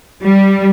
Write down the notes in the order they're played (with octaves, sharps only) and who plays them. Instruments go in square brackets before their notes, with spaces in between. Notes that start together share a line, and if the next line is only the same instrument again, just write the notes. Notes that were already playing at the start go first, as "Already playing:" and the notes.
[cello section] G3